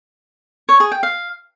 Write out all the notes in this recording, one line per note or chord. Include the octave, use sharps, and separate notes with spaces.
C#5
G#4
G5
F5